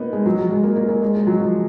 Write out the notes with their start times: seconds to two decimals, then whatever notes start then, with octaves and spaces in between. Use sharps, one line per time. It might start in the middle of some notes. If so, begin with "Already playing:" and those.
Already playing: A#3 B3 D#4
0.13 G#3
0.26 F#3
0.38 F#3
0.51 G#3
0.64 A#3
0.76 A#3
0.89 A#3
1.02 G#3
1.15 G#3
1.27 F#3
1.40 F3